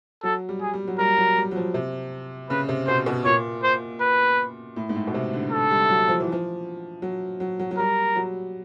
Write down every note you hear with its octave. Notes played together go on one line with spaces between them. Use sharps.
F#3 A4
G3
G#4
G3
F#3
G3 A#4
F#3
G3
F#3
F3
C3
C#3 B4
C3
B2 C5
B2
A#2 C#5
C5
B4
A2
G#2
A2
B2
C3
D3
A4
G3
F#3
F3
E3
F3
F#3
F#3
F#3
F#3
G3 A#4
F#3